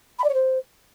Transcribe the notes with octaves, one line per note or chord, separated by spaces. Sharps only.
B5
D5
C#5
C5